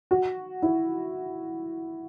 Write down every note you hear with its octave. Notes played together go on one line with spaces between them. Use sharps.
F#4
E4